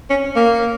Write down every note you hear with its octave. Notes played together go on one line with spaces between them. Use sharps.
C#4
A#3